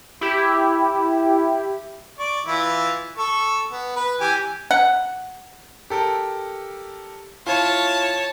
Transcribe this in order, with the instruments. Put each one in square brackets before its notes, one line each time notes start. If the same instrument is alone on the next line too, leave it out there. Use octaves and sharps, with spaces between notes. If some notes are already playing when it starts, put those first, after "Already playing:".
[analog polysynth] E4 G4
[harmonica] D5 C#6
E3 E4 F4
A4 C#6
B3
B4
E3 G4 G#5
[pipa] F#5
[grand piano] G4 A4 A#4
[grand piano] E4 F4 [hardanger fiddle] C#5 A5